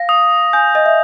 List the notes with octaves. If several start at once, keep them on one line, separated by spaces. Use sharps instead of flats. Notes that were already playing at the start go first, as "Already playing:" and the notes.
Already playing: F5 A#6
D#6
G#5 G6
D#5
E5